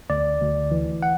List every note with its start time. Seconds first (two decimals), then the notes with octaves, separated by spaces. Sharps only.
0.10 D2 D5
0.41 D2
0.71 E3
1.03 F#5